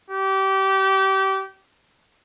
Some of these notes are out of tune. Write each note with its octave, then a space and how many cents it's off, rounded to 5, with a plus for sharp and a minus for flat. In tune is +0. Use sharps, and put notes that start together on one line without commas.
G4 -25